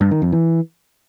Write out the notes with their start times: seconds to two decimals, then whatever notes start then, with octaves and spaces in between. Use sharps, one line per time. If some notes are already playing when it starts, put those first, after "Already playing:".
0.01 G2
0.11 D#3
0.22 F2
0.32 E3